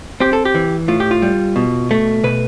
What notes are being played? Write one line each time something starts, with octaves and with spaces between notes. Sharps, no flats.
C4 G4
A4
G4
E3
A2 F4
G4
F4
G3
B2
A3
B2 B4